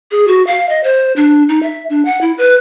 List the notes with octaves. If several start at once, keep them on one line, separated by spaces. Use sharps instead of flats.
G#4
F#4
F5
D#5
C5
D4
D#4
E5
D4
F#5
E4
B4